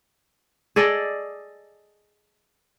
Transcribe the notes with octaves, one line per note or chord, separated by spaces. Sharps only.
G#4 A4 D5 D#5